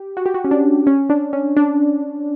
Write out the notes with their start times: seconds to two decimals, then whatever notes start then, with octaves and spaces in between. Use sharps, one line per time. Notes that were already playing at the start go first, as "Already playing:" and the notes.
Already playing: G4
0.17 F#4
0.26 G4
0.34 F#4
0.44 C#4
0.51 D4
0.87 C#4
1.10 D4
1.33 C#4
1.57 D4